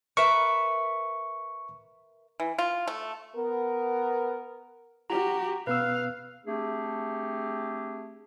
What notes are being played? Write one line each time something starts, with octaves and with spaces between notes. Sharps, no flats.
A#4 B4 E5 C#6
E3
F4
A3
B3 A#4
F#4 G4 A#5
B2 B3 B4 F5 E6
A3 C4 D4 G4 G#4